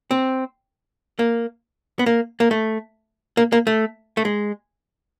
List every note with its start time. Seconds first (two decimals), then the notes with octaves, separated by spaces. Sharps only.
0.11 C4
1.19 A#3
1.99 B3
2.06 A#3
2.40 A#3
2.51 A3
3.37 A#3
3.52 A#3
3.67 A3
4.17 A3
4.25 G#3